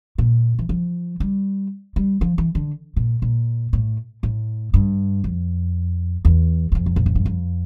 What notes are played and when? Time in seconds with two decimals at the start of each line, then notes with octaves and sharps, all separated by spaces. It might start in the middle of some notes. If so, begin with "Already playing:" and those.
0.18 A#2
0.59 E3
0.69 F3
1.20 G3
1.96 G3
2.21 F3
2.38 E3
2.55 D3
2.96 A#2
3.22 A#2
3.73 A2
4.23 A2
4.74 G2
5.24 F2
6.25 E2
6.72 E2
6.75 F2
6.86 C3
6.96 A#2
7.06 A2
7.15 G2
7.25 F2